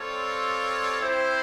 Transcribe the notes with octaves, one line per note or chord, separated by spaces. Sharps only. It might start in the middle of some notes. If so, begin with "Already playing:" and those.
Already playing: G3 C4 F4 A4 C#5
C4 E4 G4 C5